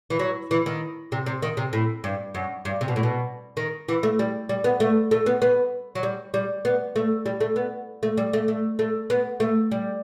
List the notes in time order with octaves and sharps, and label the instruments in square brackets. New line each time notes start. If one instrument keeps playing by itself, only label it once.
[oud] E3
F#3
E3
D#3
C3
C3
D#3
C3
A2
G2
F#2
G2
C3
B2
A2
B2
D#3
E3
A3
G3
G3
B3
A3
A3
B3
B3
F#3
G3
G3
B3
A3
G3
A3
B3
A3
G3
A3
A3
A3
B3
A3
G3